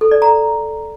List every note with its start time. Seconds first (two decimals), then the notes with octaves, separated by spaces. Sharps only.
0.01 A4
0.11 D5
0.22 A#5